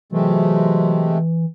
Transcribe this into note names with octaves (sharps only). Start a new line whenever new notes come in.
C3 E3 F#3 G#3 A3